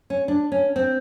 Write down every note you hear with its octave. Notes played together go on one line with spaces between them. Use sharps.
C#4
D4
C#4
C4